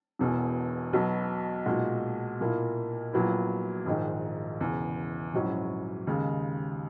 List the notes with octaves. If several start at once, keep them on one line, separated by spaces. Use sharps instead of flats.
E1 E2 B2
B1 B2 F#3 B3
B1 A#2 G#3 D#4 F#4
B1 A#2 A#3 E4
A#1 A#2 F#3 B3 E4
A#1 G#2 D#3 G#3 D#4
E1 E2 C#3
A#1 G#2 F#3 C#4 E4
D#2 C#3 G#3